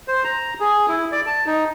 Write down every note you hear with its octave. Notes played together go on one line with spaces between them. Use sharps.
C5
A#5
G#4
E4
D5
A5
D#4